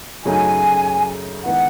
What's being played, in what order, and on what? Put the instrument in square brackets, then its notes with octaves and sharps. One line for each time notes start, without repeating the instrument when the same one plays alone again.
[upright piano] F#2 C#3 F#3 A3 D#4 [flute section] G#5
[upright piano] D#3 G#3 B3 E4 [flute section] F#5